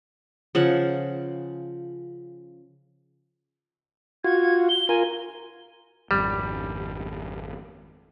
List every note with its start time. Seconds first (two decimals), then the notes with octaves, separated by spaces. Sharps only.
0.55 C#3 F3 F#5
4.24 F4 F#4 G#6
4.69 G7
4.89 F4 A#4 G#5
6.11 G#1 F2 G3